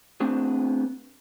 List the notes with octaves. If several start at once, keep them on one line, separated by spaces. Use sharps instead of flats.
A3 B3 C4 D4 G#4